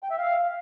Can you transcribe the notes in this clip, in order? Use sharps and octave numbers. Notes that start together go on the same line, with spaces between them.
G5
E5
F5